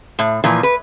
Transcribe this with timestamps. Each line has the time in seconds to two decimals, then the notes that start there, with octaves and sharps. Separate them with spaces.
0.19 A2
0.44 A#2 E3 F3
0.63 B4